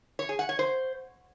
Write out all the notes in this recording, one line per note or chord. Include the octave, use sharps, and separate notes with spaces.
C#5
G#4
F#5
C#5
C5